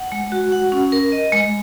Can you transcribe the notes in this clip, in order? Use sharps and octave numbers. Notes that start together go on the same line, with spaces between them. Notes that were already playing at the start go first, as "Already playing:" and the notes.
Already playing: F#5
G#3
F#4
F#5
C#4
A#4
D#5
G#3